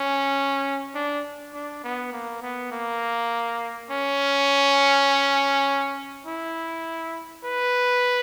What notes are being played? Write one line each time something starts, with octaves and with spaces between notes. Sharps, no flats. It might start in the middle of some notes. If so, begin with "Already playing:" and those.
Already playing: C#4
D4
D4
B3
A#3
B3
A#3
C#4
E4
B4